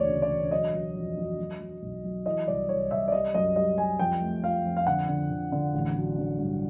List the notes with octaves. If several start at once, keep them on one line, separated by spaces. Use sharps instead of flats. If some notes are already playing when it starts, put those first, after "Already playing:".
Already playing: E1 D2 C#5 D5
C#3
D5
E1
F#3 D#5
F#3
F2
F#3
F#3
F#3
B1
F#3
E3 D#5
C2 D5
C2 C#5
C2 E5
D5
G3 D#5
F#2 D#5
G3 D#5
G3 G#5
F2 G5
A3
F3 F5
F2
F5
D3 F#5
D3
D3
D3
A1
F#3
D3
G2